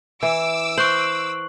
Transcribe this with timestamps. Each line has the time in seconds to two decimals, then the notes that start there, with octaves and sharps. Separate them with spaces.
0.23 E3 D6 E6
0.78 C5 C#6 F#6 F#7